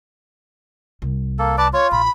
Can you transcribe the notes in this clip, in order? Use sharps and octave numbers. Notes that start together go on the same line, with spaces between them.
C2
A#3 A4
B4 D5 A5 D6
F4 C#5
A#1 B5